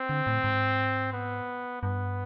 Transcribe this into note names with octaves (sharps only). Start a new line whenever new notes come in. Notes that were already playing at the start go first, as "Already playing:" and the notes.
Already playing: C4
D3
A2
G#2
B3
G2 B3